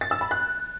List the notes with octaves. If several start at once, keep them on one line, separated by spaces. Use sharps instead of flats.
A6
E6
B5
F#6